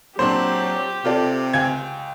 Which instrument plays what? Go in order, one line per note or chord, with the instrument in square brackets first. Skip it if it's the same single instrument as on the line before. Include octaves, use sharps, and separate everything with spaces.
[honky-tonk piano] A#2 C4 D4 [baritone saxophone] F#3 [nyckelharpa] G4 [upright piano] C5
[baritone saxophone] C3 [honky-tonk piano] F4 A4 D5
[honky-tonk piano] C#2 G5 [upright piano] G#5 G#6